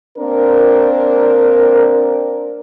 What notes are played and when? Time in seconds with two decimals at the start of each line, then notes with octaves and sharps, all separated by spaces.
0.18 A#3 C4 D4 A#4